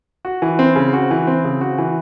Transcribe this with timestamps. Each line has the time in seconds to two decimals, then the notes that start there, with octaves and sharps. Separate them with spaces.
0.25 F#4
0.42 E3
0.59 C4
0.76 C#3
0.93 F#4
1.11 E3
1.27 C4
1.44 C#3
1.61 F#4
1.78 E3